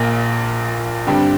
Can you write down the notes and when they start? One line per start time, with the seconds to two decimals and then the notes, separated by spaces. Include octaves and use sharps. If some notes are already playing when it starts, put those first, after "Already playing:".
Already playing: A#1 A#2 A#3
1.07 G2 D3 G3 C4